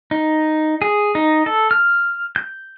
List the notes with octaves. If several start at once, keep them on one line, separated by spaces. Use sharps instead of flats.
D#4
G#4
D#4
A4
F6
G6